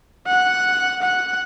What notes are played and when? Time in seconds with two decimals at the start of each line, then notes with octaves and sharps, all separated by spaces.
0.27 F#5
1.02 F#5